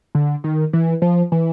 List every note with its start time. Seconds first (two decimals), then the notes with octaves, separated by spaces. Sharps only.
0.15 D3
0.44 D#3
0.73 E3
1.02 F3
1.32 E3